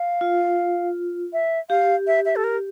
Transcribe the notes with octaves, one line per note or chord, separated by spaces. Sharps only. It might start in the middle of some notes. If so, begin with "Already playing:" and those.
Already playing: F5
F4
E5
G4 F5
E5
E5
A4
A#4